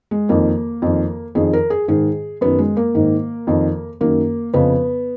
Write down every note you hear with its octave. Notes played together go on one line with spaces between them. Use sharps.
G#3
F2 D#3 A#3
F2 D#3
F2 D#3 G#4
A#4
G#4
G#2 D#3 G#4
F#2 D#3 B3
G#3
A#3
G#2 D#3
F2 D#3
F#2 D#3 A#3
F2 C#3 B3